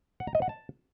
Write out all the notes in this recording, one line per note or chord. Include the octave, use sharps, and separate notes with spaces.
F#5
A#5
D#5
F#5
A5